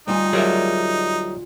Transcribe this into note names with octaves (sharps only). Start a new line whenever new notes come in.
D2 G3 D#4 F4 G#5
F#3 G3 G#4 A#4 E5